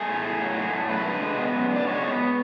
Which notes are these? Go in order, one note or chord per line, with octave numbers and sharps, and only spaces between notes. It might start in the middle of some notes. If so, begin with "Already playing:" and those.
Already playing: A3 G#4
A2
A2
F#3
A3
A2
F#2 B4
D3
G#3
B3
F#2
D3 D5
G#3 C#5
B3